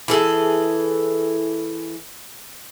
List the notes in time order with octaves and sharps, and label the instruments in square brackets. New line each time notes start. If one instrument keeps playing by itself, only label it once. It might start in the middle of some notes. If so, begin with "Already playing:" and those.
[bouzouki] E3 G#4 A4